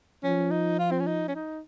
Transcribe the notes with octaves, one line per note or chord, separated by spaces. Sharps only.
F3 C#4
D#4
F4
C4
C#4
D#4
C#4
D#4